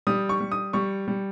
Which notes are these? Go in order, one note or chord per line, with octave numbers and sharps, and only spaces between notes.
G3 D#6
C#6
G3
D#6
G3 C#6
G3